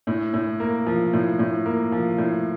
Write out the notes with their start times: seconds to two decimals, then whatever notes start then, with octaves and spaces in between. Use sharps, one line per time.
0.07 A2
0.34 A2
0.60 A#3
0.87 F3
1.13 A2
1.39 A2
1.66 A#3
1.92 F3
2.18 A2